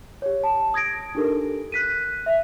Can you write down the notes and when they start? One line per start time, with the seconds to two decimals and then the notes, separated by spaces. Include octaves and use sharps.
0.22 G4 C#5
0.44 A5
0.74 D#6 G#6 A#6 D7
1.15 D4 D#4 G4 A4 A#4
1.72 F#6 B6 D#7
2.26 E5